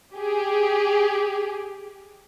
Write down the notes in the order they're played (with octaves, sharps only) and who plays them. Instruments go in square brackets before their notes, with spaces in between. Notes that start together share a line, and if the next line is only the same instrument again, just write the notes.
[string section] G4 G#4